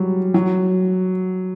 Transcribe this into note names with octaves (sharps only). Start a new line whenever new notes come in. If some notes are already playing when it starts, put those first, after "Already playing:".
Already playing: F#3 G3
F#3